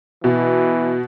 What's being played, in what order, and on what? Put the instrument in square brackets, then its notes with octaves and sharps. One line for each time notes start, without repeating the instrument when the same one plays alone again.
[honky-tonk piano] B2 [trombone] E3